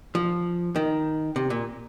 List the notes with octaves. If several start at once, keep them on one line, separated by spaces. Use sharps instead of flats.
F3
D#3
C3
A#2